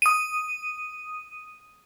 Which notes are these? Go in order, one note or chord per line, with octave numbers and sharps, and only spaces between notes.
D#6 D#7